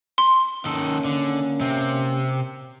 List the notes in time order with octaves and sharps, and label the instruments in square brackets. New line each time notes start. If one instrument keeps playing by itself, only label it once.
[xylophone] C6
[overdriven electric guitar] D#3 A4 [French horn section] A#3 C#4
[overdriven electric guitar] D3
C3 C4